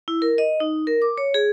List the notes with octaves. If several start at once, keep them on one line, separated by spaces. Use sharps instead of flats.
E4
A#4
D#5
D#4
A#4
D6
C#5
G#4